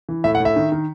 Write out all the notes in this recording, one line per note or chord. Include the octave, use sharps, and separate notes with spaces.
E3
A2 E5
F#5
A2
E5
D#3
D#3